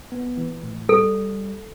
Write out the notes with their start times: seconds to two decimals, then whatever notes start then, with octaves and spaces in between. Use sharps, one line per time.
0.12 B3
0.37 E3
0.63 A2
0.89 G3 A4